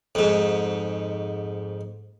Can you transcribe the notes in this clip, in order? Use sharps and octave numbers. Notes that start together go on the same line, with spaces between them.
F2 G#2